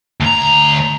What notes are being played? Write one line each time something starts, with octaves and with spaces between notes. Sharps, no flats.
D2 A#5